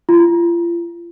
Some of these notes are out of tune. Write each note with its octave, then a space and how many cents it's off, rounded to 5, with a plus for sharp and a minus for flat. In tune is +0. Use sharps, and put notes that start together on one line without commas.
F4 -35